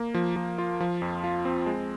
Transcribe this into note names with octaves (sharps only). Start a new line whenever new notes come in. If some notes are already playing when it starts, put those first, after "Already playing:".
Already playing: A#3
F3
F3
F4
F3
F2
F4
C4
G#3